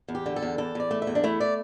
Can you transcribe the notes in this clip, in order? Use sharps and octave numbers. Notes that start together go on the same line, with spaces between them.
E2
G4
D3
A4
E2
E2 A4
E2 D5
A3
E5
E2
D4
A3 E4
D5